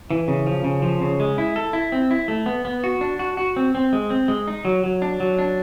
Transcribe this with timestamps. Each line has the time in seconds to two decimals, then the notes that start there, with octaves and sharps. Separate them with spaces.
0.11 E3
0.28 C#3
0.46 F3
0.64 C#3
0.82 F3
1.02 C#3
1.20 G#3
1.38 E4
1.56 A4
1.73 E4
1.92 C4
2.11 E4
2.28 A3
2.46 B3
2.65 B3
2.84 F#4
3.01 D4
3.19 F#4
3.37 F#4
3.56 C4
3.75 C4
3.93 G#3
4.10 C4
4.28 G#3
4.47 D#4
4.65 F#3
4.84 F#3
5.02 D4
5.20 F#3
5.38 D4